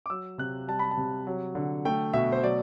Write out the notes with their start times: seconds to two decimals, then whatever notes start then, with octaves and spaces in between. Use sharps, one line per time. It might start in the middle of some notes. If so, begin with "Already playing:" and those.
0.06 D6
0.10 F#3 E6
0.38 C3 F#6
0.68 G3 A5
0.79 B5
0.91 A5
0.97 C3
1.27 F#3
1.55 D3
1.85 A3 G5
2.13 B2 E5
2.32 C5
2.43 F#3 D5